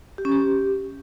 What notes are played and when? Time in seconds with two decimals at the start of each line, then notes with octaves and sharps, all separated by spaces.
0.18 G4
0.25 C#4
0.32 G4